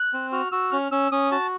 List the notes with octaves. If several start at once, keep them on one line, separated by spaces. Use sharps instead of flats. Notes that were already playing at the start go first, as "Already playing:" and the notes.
Already playing: F#6
C4
F#4 F6
F#4 E6
C#4 F6
C#4 E6
C#4 D#6
F#4 A5